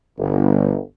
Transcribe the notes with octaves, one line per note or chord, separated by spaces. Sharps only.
G1